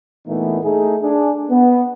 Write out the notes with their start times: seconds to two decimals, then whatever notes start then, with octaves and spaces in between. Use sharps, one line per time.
0.27 A#2 E3 A3 B3 D#4
0.63 A3 D#4 G#4
1.01 D4 G#4
1.50 B3